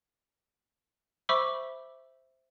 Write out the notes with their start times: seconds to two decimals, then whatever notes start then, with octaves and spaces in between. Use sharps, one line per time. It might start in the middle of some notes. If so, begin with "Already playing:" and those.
1.29 C5 E5 B5 C#6 D6 E6